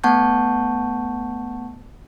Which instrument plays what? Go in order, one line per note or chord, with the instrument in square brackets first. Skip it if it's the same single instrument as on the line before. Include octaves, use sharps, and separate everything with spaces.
[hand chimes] A3 B3 F#5 A5 C#6 G6